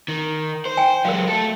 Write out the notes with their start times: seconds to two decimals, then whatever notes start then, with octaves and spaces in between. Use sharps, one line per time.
0.08 D#3
0.65 C5
0.77 G5 G#5
1.05 F#3 G#3 A#4 F5
1.28 A3 A4